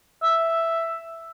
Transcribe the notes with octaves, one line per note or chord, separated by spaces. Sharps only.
E5